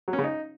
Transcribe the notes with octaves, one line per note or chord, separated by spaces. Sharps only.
F#3
C#4
C#3
D#4